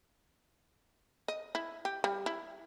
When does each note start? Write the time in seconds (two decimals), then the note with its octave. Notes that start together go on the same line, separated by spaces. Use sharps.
1.28 D#5
1.55 E4
1.85 G4
2.04 G3
2.26 E4